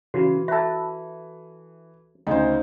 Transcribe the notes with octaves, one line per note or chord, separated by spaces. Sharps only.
C#3 E3 F#4
A4 B4 E5 A5
D2 C#3 D#4 C5